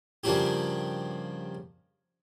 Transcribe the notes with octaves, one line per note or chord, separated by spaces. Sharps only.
G2 C#3 F3 A#3 F#4 G4